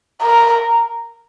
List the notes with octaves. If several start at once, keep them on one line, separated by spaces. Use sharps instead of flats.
A#4